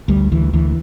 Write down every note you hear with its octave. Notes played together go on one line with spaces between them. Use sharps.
D2 G3
D2 E3
D2 E3